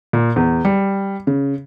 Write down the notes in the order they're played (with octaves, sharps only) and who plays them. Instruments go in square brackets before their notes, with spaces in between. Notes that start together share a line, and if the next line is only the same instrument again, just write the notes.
[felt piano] A#2
E2
G3
C#3